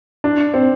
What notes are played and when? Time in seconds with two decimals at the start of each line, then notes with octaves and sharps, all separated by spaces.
0.24 D4
0.54 C4